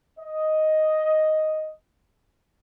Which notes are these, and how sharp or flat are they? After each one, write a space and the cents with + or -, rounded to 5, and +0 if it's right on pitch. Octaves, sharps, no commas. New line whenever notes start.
D#5 +5